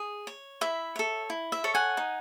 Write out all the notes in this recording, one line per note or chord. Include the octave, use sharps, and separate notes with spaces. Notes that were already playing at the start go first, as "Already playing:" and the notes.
Already playing: G#4
C#5
E4 E5
A4 C#5
E4
E5
A4 C#5
F#5 G#5
D#4